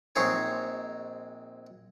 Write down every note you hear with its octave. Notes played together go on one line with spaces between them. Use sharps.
A#1 G#3 C4 D#4 G#4 C#5